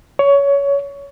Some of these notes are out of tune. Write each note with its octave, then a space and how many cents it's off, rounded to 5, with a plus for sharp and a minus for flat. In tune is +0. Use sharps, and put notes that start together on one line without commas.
C#5 +20